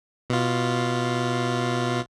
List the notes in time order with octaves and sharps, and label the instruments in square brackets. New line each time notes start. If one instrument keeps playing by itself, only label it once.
[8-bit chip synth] B2 F4